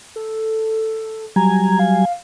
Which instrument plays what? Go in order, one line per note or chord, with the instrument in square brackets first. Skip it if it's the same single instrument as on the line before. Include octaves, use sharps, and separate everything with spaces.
[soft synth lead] A4
[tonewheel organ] F#3 G3 G#5 [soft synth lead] A#5
[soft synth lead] F5